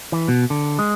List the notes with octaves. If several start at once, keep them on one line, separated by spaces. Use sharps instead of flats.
E3
B2
D3
G#3